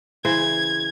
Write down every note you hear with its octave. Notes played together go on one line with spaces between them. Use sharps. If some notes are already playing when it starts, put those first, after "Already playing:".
C#3 E3 C5 G#6